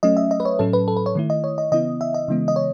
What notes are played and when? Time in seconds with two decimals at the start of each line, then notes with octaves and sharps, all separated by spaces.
0.03 F#3 A3 C#4 D#5
0.17 E5
0.31 D#5
0.40 B4
0.45 C#5
0.59 A2 F#3 C#4 A4
0.73 B4
0.88 A4
0.97 B4
1.06 C#5
1.15 D#3 A3 E4
1.30 D#5
1.44 C#5
1.58 D#5
1.72 C#3 E3 B3 E4 D#5
2.01 E5
2.14 D#5
2.28 C#3 E3 G#3 B3
2.48 D#5
2.56 C#5